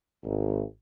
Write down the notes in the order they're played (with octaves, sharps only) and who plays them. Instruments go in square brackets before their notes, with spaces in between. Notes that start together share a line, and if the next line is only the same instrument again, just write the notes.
[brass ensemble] G#1